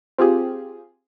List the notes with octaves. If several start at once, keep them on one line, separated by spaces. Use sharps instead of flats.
C4 F4 G4 G#4